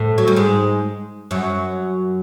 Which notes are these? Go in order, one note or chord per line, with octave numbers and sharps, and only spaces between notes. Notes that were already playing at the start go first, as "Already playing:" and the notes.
Already playing: A2 A3
F#3
G3
G#2 G#3
F#2 F#3